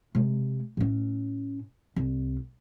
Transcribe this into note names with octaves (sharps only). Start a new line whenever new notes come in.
C3 G#3
A2 C#4
C2